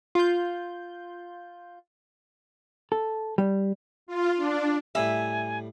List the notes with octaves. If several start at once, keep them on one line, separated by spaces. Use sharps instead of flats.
F4 G6
A4
G3
F4
D4
A2 G3 E5 G#5